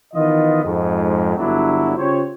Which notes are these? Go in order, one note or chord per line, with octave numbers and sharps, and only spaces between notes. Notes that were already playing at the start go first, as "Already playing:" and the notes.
D#3 E3 B3 F4 D#5
F2 G#2
G1 F#3 D4 E4
C#3 F4 G4 C5 C#5